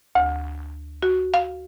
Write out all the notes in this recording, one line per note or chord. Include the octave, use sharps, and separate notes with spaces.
D2
F#4
F5